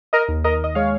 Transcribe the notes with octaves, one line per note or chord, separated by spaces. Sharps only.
A#4 D#5
D#2
A#4 D#5
D#5
G#3 C#5 F5